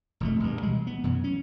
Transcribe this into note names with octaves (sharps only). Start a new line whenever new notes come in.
E1 F2 A3
A#1 G2
B2 E3 G3 G#3
B3
F#2 B2 E3
C#4